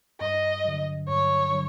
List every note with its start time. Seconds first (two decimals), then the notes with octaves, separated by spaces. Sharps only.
0.20 G2 D#5
0.65 D3 F#3
1.08 G2 C#5
1.52 D3 F#3